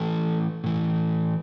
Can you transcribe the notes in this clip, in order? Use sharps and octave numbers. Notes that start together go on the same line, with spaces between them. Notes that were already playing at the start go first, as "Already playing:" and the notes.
Already playing: A2 E3 A4
A2 E3